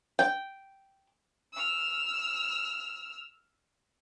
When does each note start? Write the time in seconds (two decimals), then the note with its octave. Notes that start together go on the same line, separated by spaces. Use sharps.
0.19 G5
1.54 E6 F6